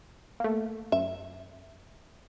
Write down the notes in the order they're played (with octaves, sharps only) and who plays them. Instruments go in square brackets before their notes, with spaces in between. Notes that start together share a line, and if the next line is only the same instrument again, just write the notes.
[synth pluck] A3 A#3
[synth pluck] F#2 [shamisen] E5